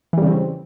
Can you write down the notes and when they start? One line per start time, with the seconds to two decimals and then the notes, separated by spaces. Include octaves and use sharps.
0.13 E3
0.18 G3
0.22 C#3
0.27 C4